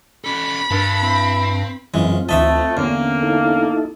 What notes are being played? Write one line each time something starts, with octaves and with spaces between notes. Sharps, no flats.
C#4 A4 B5
G2 A#4 A5
C4 E4
F#2 E3 G#3 C4 F4
D2 E3 A3 D#5 E5 A5 D#6
E2 D3 A#3 C#4
D#4 E4 A4